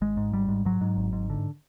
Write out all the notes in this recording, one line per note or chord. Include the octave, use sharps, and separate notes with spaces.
G#1 G#3
G#2
G#1 G3
G#2
G#2 F#3
G#2
G#1
G#2
D3